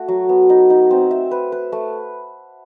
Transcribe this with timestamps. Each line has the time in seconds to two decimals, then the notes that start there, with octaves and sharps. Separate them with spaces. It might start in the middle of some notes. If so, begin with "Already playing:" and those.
Already playing: A3 F#4
0.08 F#3
0.29 B3
0.50 D#4
0.70 D#4
0.91 C4
1.11 E5
1.31 B4
1.52 B4
1.72 A3